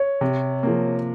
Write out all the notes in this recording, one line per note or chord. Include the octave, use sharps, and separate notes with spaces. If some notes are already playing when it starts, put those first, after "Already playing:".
Already playing: C#5
C3
F3 A#3